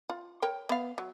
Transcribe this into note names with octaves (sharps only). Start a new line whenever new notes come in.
F4
A#4 C#5 G5
B3 F5
F#3